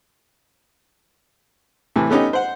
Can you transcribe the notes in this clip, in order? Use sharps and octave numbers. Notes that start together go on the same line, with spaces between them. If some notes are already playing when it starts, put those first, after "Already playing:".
A2 C3 E3
A3 B3 C#4 D#4 G4
C5 F#5